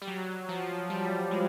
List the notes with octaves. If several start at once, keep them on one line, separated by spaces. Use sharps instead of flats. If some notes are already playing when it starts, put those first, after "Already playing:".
G3
F#3
F3
G3
G#3